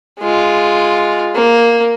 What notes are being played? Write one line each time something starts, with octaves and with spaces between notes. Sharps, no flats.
G#3 F4
A#3